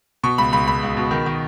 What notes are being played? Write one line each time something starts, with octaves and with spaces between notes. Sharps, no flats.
B2 C#6
C#2 B5
C#2 B5
C#2 B5
C#2
B2
D#3
D#3